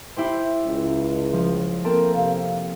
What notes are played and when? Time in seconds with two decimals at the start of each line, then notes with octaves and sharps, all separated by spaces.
0.17 E4 G4 C5
0.64 C#2
1.33 F3
1.84 A#3 C4 A4 A#4
2.15 C3 F5